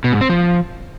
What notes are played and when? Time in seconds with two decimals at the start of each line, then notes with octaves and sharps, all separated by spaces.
0.04 B2
0.13 G#2
0.21 C4
0.29 F3